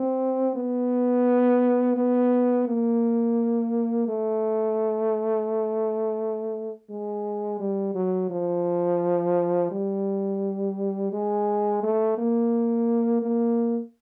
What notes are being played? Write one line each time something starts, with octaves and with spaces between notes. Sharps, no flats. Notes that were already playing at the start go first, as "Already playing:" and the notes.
Already playing: C4
B3
B3
A#3
A3
G#3
G3
F#3
F3
G3
G#3
A3
A#3
A#3